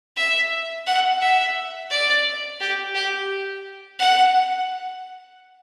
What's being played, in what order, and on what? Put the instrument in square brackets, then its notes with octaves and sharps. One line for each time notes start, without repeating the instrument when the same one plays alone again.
[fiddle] E5
F#5
E5
D5
G4
G4
F#5